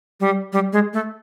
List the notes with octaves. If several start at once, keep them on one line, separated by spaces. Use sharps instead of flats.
G3
G3
G#3
A3